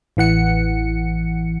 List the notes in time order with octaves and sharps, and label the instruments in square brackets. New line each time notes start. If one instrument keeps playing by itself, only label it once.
[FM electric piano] A1 E3 F#5 C#7